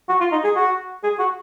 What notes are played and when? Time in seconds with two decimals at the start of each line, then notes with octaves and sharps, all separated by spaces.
0.09 F#4
0.20 F4
0.32 D#4
0.44 G#4
0.56 F#4
1.04 G#4
1.19 F#4